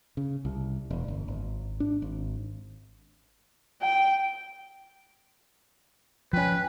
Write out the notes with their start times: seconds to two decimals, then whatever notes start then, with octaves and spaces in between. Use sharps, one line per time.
0.17 C#3
0.45 C2
0.90 E1
1.08 G1
1.28 G#1
1.80 D4
2.02 G#1
3.82 G5
6.33 F3 C#4 B4 G5 G#5